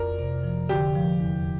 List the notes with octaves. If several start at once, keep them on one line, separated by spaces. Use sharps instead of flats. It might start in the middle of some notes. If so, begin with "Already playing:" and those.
Already playing: F2 A#4 D5
C3
F3
D3 G4
F3
E2